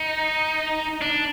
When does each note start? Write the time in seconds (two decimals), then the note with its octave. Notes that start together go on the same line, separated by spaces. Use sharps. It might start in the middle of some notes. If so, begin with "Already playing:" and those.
Already playing: D#4
1.01 D4